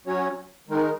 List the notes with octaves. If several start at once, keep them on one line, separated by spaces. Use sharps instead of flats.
F#3 C#4 F#4 C#5
D#3 G#3 D#4 A#4